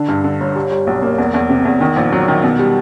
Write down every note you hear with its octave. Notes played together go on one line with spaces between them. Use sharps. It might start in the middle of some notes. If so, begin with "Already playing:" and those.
Already playing: D3
G2
D3
G1
G3
G3
B1
A#3
E2
E2
C3
E2
D#3
A#1
F#3
D#3
B2
G3